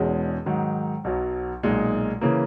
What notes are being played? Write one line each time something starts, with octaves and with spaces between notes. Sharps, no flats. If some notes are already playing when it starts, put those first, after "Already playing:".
Already playing: E1 E2 B2 G#3 C#4
G#2 D#3 F#3
B1 B2 F#3
B1 A#2 G#3 D#4
C#3 E3 A#3